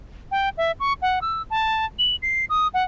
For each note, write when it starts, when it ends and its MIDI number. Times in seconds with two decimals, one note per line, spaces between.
0.31 0.49 79
0.57 0.72 76
0.80 0.93 85
1.02 1.19 78
1.21 1.42 88
1.50 1.85 81
1.99 2.16 102
2.22 2.45 96
2.50 2.68 87
2.74 2.84 78